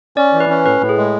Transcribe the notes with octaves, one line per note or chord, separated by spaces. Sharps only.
C#4 D5
E3
B4
C#4
A2 B4
A2
G#4
G#3